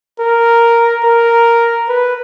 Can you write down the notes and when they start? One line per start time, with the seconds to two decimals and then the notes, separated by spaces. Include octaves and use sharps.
0.19 A#4
1.04 A#4
1.89 B4